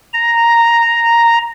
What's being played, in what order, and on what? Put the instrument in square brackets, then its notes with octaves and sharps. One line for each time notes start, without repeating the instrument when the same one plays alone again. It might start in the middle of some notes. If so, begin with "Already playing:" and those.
[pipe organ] A#5